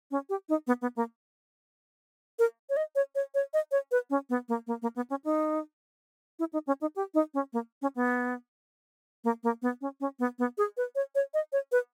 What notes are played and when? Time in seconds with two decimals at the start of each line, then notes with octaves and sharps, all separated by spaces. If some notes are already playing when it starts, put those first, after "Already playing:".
0.11 C#4
0.29 G4
0.49 D#4
0.67 B3
0.82 B3
0.96 A#3
2.39 A#4
2.69 C#5
2.77 D#5
2.95 C#5
3.15 C#5
3.34 C#5
3.53 D#5
3.71 C#5
3.91 B4
4.10 C#4
4.29 B3
4.48 A#3
4.67 A#3
4.82 A#3
4.96 B3
5.10 C#4
5.24 D#4
6.39 E4
6.53 D#4
6.67 C#4
6.81 D#4
6.96 G4
7.14 D#4
7.34 C#4
7.53 A#3
7.82 C#4
7.95 B3
9.24 A#3
9.43 A#3
9.62 B3
9.81 C#4
10.00 C#4
10.19 B3
10.39 B3
10.58 G#4
10.77 B4
10.95 C#5
11.15 C#5
11.34 D#5
11.52 C#5
11.72 B4